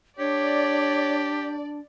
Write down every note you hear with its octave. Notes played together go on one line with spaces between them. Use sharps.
D4 G4 C#5 D5